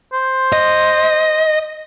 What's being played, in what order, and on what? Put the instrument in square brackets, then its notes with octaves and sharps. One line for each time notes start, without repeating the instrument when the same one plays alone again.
[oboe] C5
[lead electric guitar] D#5